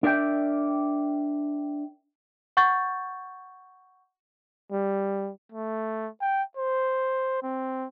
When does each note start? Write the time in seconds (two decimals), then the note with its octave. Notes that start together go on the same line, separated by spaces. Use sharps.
0.03 D4 A#4 D5 E5 G5
2.57 F#5 C#6 G6 A6
4.72 G3
5.52 A3
6.21 G5
6.57 C5
7.43 C4